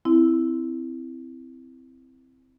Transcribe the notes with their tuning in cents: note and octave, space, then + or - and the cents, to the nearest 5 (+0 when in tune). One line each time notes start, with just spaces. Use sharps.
C4 -10 E4 +0